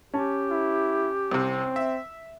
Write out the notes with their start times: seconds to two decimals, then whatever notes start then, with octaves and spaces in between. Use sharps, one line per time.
0.14 C#4 G4 A5
0.51 E4
1.31 C2 C3 C4
1.76 E5